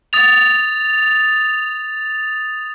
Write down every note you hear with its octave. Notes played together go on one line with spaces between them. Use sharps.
D#6 A6 F7